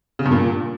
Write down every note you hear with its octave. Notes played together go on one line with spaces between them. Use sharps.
C#3
G2
A#2